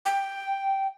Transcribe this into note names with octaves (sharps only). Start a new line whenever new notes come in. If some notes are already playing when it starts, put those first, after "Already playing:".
G5